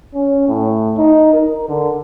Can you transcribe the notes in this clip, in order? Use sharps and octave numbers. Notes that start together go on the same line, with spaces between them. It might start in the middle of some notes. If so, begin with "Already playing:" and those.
C#4
A2
D#4
A#4
D3